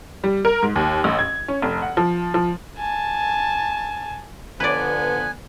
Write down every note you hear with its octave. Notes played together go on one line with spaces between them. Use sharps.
G3
A#4
G#2
D#2
A1
G#6
C#4
F1
F#5
F3
F3
G#5 A5
D3 F3 B3 B4 D5 G#5